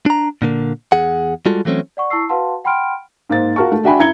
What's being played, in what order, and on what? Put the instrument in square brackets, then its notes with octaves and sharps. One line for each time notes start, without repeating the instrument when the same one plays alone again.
[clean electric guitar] D4 A#5
A#2 D3 A#3
E2 G#4 F#5
G3 G#3 F4 F#4 A4
E3 F#3 A3 C4 C#4
[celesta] D5 F#5 C#6
E4 A5 C#6 E6 C7
F#4 B4 F5 F#5 A5 C6
F#5 G5 B5 C6 F6 D7
[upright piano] G#2 A#3 C5 A6
F4 F#4 A#4 A5 C#6
A3
D4 F#4 E5 G5 G#5 B5
F#2 E4 A#5 G#6 C#7 G7